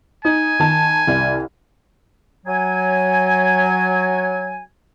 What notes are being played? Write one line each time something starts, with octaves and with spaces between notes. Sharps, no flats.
D#4 G#5
D#3 A5
C2
F#3 G#5